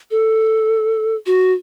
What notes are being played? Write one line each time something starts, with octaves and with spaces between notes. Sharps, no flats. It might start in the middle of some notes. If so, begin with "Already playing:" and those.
A4
F#4